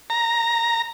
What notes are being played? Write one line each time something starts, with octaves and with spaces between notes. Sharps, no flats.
A#5